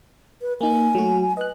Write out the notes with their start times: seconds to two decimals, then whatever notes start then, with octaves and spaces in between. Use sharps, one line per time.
0.41 B4
0.61 A#3 D#4 G#5
0.95 F#3 A3 F#4
1.37 B4 D#5 F#6